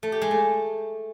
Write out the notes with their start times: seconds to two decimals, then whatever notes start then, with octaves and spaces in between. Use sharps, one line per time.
0.03 A3
0.12 G4
0.22 G#3
0.31 A3